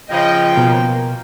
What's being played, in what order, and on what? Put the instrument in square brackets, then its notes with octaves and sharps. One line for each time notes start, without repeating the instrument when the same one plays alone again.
[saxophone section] C#3 F3 [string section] D#5 [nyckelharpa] G5
[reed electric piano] B2 [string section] A#3